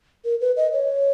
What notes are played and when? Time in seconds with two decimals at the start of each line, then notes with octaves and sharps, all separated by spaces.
0.25 A#4
0.41 B4
0.57 D#5
0.73 C#5